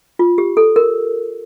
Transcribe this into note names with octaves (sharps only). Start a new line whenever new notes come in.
F4
G4
A4
A#4